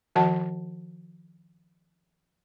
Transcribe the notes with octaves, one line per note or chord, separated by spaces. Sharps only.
D#3 F3 F#4 D#5 F#5 A5